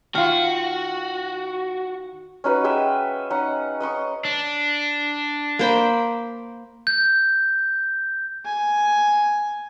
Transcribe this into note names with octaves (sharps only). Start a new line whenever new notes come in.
D#3 F4 F#4
C#4 D#4 F#4 B4
G#3 G#4 E5 G5
C#4 D#4 F#5
D#5 F#5 C#6 D#6
D4
A#3 C5 B5
G6
G#5